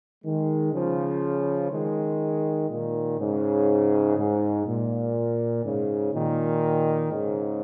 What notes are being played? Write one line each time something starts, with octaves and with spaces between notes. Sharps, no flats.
D#3 G#3
C#3 F3
D#3 G#3
A#2 D#3
G#2 C#3
G#2
A#2
G#2 C#3
A#2 D#3
G#2 C#3